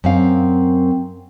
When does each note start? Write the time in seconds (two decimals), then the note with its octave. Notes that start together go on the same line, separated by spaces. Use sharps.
0.04 F#2 C4 F5